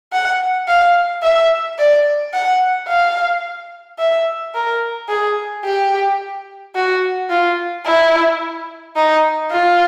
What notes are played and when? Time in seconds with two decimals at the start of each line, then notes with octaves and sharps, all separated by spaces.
0.13 F#5
0.68 F5
1.23 E5
1.79 D5
2.34 F#5
2.88 F5
3.99 E5
4.55 A#4
5.09 G#4
5.65 G4
6.75 F#4
7.30 F4
7.85 E4
8.96 D#4
9.51 F4